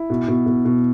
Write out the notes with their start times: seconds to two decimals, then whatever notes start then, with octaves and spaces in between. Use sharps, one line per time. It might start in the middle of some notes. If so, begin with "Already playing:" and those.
Already playing: E4
0.10 B2
0.28 B2
0.46 B2
0.65 B2